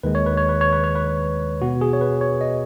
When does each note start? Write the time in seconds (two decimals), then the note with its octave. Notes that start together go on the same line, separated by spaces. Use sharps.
0.03 D#2 D#3 G#3 B4
0.15 C#5
0.26 B4
0.37 C#5
0.49 B4
0.61 C#5
0.73 B4
0.84 C#5
0.95 B4
1.61 B2 B3 F#4
1.81 G#4
1.93 C#5
2.01 B4
2.21 C#5
2.41 D#5